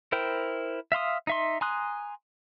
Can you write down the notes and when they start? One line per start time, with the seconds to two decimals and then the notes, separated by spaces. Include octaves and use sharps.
0.12 E4 A#4 C5 G5
0.92 E5 F5 C6 D#6
1.27 D#4 E5 C6
1.61 G#5 A#5 C6 D#6 F#6